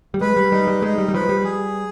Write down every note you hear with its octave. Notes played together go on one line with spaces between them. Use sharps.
G3
G#3 B4
G3
G3 D#4
G3
G#3 D#4
G3
G3
F3 B4
G3
G#4